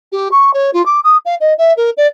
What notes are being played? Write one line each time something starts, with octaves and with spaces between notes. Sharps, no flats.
G4
C#6
C#5
F4
D6
D#6
F5
D#5
E5
A#4
D5